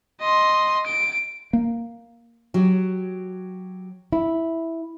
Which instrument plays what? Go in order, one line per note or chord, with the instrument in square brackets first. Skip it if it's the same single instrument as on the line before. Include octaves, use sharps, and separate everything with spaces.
[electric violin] D#5 C6
D7
[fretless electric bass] A#3
[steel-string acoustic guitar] F#3 F#4 G4
[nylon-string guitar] E4